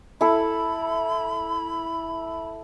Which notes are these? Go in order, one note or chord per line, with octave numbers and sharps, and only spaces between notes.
E4 A4 B5